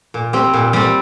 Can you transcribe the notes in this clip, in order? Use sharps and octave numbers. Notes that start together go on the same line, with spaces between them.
A#2
G3 C4
A#2
G3 C4